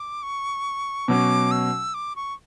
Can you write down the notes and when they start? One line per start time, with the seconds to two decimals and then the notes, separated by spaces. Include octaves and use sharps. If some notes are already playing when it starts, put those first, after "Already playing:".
Already playing: D6
0.23 C#6
1.08 B2 F#3 C#4 D6
1.51 E6
1.94 D6
2.16 C#6